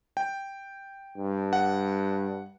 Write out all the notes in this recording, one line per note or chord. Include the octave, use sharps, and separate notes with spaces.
G5
G2
F#5